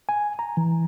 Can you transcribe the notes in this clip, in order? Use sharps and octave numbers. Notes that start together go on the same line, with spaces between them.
G#5
A#5
E3